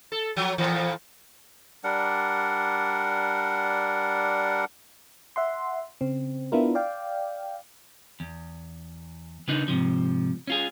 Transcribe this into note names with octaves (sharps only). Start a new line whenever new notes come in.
A4
F3 F#3
F2 A#2 E3
G3 D4 A#4 F#5
E5 F#5 C6
C#3 C4
B3 D4 E4 F4 A#4
D5 F5 G5
E2
C#3 B3 D4 D#4
G#2 C3 F3
C#4 F4 G#4